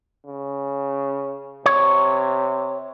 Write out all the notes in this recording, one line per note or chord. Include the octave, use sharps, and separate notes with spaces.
C#3
C3 C#5